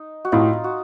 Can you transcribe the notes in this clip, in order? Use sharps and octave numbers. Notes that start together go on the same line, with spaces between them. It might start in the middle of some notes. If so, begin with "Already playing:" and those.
Already playing: D#4
F#4
A2 D#4 F4
F#4